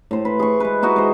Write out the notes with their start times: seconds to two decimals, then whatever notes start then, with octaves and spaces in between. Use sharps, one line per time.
0.11 A2 C5
0.25 B4
0.39 G#4 C#6
0.60 G#3 B4
0.82 D#4 E4 F#4 D#5
0.96 G#3 C5